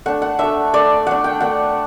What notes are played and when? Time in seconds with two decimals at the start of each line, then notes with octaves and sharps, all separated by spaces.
0.06 A3 D4 F#5
0.22 F#5
0.39 A3 D4 E5
0.73 A3 D4 D5
1.07 A3 D4 F#5
1.24 G5
1.40 A3 D4 F#5